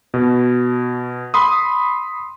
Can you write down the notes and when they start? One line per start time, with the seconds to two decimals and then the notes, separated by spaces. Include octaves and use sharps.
0.14 B2
1.34 B5 C6 D#6